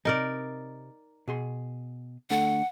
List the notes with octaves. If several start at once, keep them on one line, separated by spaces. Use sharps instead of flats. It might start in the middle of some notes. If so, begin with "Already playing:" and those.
C3 D#4 A#4 D5
B2 G#4 C6
D3 A3 A4 F#5